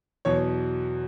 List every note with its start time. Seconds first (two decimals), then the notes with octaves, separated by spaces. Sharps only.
0.25 E2 B2 F#3 C#5